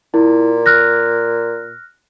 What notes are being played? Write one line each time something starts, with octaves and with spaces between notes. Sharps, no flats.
A#2 E4
F6 F#6 A#6